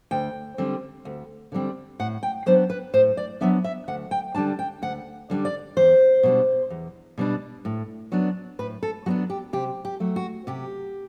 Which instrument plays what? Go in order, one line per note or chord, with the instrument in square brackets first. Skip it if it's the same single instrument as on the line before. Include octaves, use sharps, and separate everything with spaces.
[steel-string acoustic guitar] D2 G5
D3 G3 C4
D2
D3 G3 C4
A2 F#5
G5
F#3 B3 D4 C5
B4
A2 C5
D5
F#3 B3 D4 E5
E5
D2 F#5
G5
D3 G3 D4 A5
G5
D2 F#5
D3 G3 D4
D5
E2 C5
B2 G3 D4
E2
B2 G3 D4
A2
F#3 B3 D4
A2 B4
A4
F#3 B3 D4 F#4
G4
C3 G4
G4
F#3 A3
F#4
C3 G4